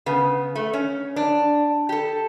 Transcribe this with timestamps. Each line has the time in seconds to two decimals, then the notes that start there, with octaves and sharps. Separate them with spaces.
0.06 C#3 B3
0.55 A3
0.73 C#4
1.16 D4
1.89 G4 A4